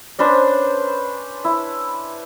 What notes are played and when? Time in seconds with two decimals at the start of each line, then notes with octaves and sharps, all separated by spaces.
0.19 C#4 D4 B4 C5
1.44 E4